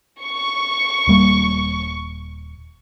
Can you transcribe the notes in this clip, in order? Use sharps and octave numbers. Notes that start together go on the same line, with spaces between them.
C#6
D#1 G3 A#3